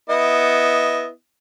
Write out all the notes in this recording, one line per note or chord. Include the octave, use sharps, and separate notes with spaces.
B3 E4 D#5